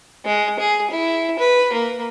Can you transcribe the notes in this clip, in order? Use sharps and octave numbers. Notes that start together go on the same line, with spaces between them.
G#3
G#4
E4
B4
A#3